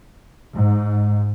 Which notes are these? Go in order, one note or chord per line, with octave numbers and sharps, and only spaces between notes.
G#2